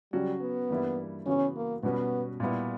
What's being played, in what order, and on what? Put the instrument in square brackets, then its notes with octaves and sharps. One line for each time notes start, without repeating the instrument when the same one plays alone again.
[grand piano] C#3 F#3 C#4 F#4 [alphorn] G3
[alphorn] B3
[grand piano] G2 E3 G3 A#3 E4
[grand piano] C#3 E3 B3 F#4 [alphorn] C#4
[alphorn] A#3
[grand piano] B2 G3 C#4 F#4 B4 [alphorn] B3
[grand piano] A#2 G3 B3 E4